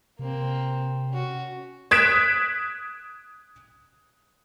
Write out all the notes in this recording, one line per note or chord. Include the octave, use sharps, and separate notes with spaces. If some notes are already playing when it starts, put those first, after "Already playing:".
C3 A#3 C4
C#4 F#4
D#6 F#6 G#6 B6 D7 E7